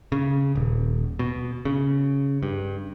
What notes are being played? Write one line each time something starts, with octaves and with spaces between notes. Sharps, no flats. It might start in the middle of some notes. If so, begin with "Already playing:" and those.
C#3
D#1
B2
C#3
G2